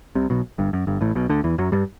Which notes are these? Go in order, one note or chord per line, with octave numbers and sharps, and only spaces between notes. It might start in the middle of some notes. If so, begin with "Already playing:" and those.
C2 C3
B1 B2
G1 G2
F#2
G1 G2
A1 A2
B1 B2
D2 D3
E2 E3
F#2 F#3
G2 G3